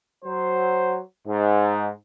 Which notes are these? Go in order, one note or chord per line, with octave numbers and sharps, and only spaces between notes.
F#3 C5
G#2